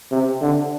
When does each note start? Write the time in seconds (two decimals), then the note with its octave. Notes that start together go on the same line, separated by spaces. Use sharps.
0.11 C3
0.41 D3